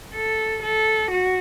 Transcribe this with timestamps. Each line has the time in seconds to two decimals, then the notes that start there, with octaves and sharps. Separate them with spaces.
0.14 A4
0.62 A4
1.11 F#4